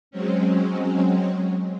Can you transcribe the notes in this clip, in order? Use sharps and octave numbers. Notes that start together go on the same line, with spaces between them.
F#3 G#3 C4 C#4